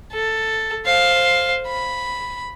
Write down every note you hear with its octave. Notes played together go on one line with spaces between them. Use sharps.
A4
C5 F5
B5